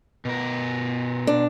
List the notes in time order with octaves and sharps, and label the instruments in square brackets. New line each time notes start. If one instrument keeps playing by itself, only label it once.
[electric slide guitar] B2 A#4
[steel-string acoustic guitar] D4